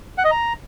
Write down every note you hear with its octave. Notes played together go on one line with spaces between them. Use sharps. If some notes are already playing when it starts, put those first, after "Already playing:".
F#5
D#5
A#5